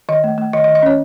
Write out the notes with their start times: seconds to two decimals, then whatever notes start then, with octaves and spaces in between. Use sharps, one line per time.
0.09 D#3 D#5
0.24 A3
0.38 A3
0.53 D#3 D#5
0.64 D#5
0.68 D#3
0.75 D#5
0.82 C#4 C#5